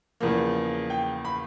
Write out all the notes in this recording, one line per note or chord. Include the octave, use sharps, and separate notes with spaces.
E2 C#3 F3 A#3
G5
B5